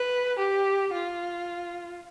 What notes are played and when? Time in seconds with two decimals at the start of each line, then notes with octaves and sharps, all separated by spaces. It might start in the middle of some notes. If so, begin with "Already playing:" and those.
Already playing: B4
0.39 G4
0.94 F4